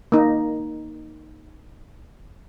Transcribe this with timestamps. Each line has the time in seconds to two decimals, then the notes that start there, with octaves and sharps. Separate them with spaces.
0.12 A#3 D#4